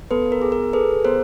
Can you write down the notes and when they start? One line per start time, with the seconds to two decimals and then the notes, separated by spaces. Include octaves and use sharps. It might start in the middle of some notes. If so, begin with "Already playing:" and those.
0.11 B3 A4 B4
0.32 A#4
0.42 G#4
0.52 A#4
0.73 G#4 A4 B4
1.04 B3 A#4 C5